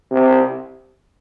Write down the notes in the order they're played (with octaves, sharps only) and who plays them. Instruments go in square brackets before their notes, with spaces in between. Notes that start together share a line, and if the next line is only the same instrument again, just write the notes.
[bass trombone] C3